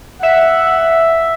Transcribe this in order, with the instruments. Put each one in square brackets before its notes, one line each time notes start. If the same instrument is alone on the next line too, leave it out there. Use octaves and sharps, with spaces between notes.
[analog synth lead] E5 [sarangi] F#5